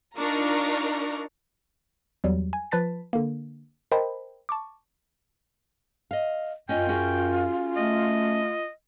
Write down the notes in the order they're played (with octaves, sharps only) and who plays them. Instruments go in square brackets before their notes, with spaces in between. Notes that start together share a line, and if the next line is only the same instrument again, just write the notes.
[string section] D4 D#4 F4 A#4 A#5 C#6
[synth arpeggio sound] E2 F#3 G3
G#5
F3 B4 A5 A6 B6
D3 A#3
A#4 C5 D#5 G5 A5 B5
A5 C#6 D6
[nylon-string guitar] D#5 F5
[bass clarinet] F#2 [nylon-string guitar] C#4 D#5 [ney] F4 [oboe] G5
[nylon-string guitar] C#4 F#4 G#4
[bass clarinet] A3 [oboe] D#5